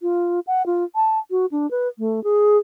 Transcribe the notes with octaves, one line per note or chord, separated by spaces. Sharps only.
F4
F#5
F4
A5
F#4
D4
B4
A3
G#4